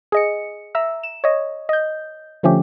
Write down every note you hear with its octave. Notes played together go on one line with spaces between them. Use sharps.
G#4 D#5 C#7
E5 A#5 E6
E7
C#5 D#5
D#5 G6
D3 F3 A3 C#4 G4